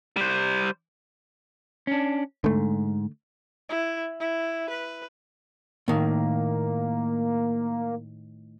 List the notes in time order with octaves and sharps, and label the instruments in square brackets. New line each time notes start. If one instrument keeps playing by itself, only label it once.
[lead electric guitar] G3 C5
[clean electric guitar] C#4 D4
[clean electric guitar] G#2 [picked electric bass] D3 A3
[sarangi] E4
E4
B4
[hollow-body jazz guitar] A2 D#3 [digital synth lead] A#3